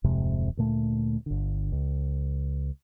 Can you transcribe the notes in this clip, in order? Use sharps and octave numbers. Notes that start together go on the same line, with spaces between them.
D1 F2 C3 G#3
D2 A#2 A3
G1 D3
C#2